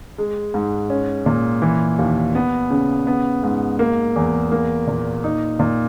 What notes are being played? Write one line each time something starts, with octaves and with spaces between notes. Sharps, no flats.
G#3
G#2
C#4
A#2
E3
D#2
B3
C#3
B3
G#2
A#3
E2
A#3
A#2
D#4
A#2